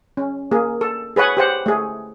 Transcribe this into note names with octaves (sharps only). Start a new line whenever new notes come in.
C#4
A#3 G#4
A4
G#4 B4 C#5 F#5 G#5
G4 C5 F#5
A3 G#4